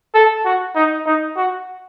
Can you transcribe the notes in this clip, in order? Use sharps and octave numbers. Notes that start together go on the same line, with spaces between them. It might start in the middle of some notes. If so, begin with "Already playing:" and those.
A4
F#4
D#4
D#4
F#4